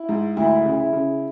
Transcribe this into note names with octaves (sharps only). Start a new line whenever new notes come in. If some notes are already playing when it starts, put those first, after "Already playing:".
Already playing: E4
G#2
D2 E4
C#3
E4
C#3